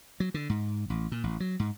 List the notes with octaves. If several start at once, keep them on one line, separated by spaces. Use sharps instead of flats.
F#3
D3
G#2
A1
A#2
A1
F#3
G#2